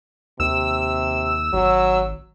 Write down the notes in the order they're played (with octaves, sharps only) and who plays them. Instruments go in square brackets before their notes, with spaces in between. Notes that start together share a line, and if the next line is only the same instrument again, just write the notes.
[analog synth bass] D#2 [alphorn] C3 [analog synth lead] E6
[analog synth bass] G#1 [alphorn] F#3